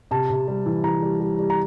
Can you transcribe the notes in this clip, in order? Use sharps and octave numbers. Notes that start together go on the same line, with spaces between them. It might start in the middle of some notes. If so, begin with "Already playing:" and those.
C3 A5
C3
G3
E3
E3 A#5
G3
G3
G3
A#5